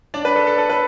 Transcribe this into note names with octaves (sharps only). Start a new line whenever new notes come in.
D4 D5
B4
A4
A4
A4
B4